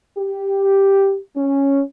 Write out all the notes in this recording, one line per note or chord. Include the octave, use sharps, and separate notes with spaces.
G4
C#4